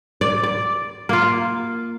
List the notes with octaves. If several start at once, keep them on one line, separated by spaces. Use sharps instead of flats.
D5
D5
A#3 F4